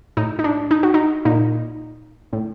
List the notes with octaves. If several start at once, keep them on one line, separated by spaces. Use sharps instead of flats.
A2 D#4
D#4
D4
D#4
F#4
D#4
A#2 D#4
A2